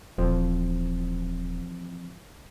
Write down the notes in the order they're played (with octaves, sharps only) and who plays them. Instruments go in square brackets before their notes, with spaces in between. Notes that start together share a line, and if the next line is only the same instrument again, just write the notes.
[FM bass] D#1 [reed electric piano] E3 F3 C4